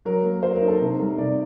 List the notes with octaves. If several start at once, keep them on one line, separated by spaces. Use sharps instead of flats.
F#3 A#4
A#3
F#3 C5
A#4
D#4
A4
C3 A#4
G3
C3 D5